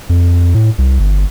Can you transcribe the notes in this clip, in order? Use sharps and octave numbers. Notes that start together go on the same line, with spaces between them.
F2
A2
C2
G1